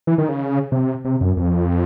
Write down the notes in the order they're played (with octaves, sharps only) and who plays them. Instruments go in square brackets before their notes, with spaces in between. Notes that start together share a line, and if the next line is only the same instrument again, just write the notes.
[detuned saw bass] E3
D#3
C#3
C3
C3
F#2
F2